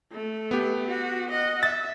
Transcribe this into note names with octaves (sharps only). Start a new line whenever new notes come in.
A3
B3 G4
F#4
D#5 F#5
E5 A6